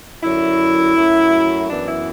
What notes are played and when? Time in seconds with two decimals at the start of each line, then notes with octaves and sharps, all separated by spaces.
0.23 F#2 D3 F#3 E4
0.96 F#2 F#3 A3
1.69 F#2 E3 B3 D4
1.87 E4